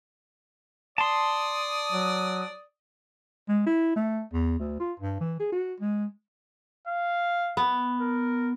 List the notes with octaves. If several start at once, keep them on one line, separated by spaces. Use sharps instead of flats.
D5 A5 C6 D#6
F#3
G#3
E4
A3
E2
D2
F4
G2
E3
G#4
F#4
G#3
F5
B3
A#4